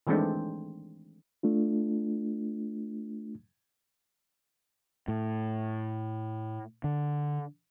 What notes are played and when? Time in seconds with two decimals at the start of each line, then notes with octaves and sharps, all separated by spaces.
0.07 D#3 E3 G#3 A3 C4 D4
1.43 A3 D4 F4
5.08 A2
6.84 D3